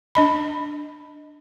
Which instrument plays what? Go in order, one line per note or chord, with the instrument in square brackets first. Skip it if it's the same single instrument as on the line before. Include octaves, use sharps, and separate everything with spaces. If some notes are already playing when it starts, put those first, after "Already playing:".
[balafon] D4 D#5 B5